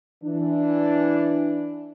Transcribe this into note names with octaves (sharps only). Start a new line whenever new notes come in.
E3 D4